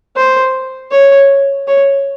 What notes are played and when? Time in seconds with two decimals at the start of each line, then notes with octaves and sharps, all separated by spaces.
0.16 C5
0.91 C#5
1.67 C#5